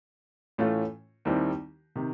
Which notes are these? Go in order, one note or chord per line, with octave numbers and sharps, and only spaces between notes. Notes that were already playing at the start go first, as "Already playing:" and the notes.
A2 E3 A3 C#4 F4
D#2 D#3 G3 C4 E4
C3 D#3